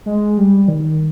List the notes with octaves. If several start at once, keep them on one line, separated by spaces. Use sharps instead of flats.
G#3
G3
D#3